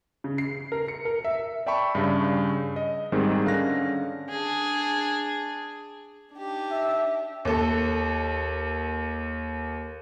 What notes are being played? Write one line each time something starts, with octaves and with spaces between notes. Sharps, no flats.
C#3
C7
A#4
C#7
A#4
E5
D5 E5 G5 A5 B5 C#6
G2 C#3
D#5
G#2 D#3 G3 C4 G#4
D3 C#4 F5 F#6 A#6
D4 G#4
D4 D#4 G4
E5
D#2 A4